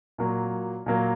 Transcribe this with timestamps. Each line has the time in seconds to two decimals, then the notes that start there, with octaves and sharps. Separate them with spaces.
0.18 A#2 F#3 A#3
0.86 A#2 F#3 A#3